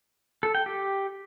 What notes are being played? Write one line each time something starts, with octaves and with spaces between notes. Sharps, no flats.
A4
G5
G4